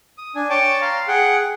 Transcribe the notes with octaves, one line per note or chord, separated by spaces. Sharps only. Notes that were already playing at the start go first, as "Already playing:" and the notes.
D#6
D4 G#5
C#5 G5 A5 D6
F5 A#5 C6
G#4 F#5 G5